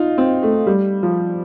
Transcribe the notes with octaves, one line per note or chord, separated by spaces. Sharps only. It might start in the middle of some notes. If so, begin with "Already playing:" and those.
Already playing: D#4 F4
C4
A3
G3
F3